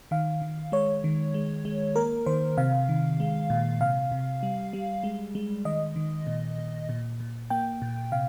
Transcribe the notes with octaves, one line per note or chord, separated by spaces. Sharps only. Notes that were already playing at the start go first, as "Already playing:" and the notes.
D#3 F5
D#3
G#3 C#5
D#3
G#3
G#3
A#3 A#4
D#3 C5
C3 F5
D#3
G#3
A#2
C3 F5
C3
G3
G3
G#3
G#3
D#3 D#5
D#3
A#2
A#2
A#2
A#2
A#3 G5
A#2
C3 F5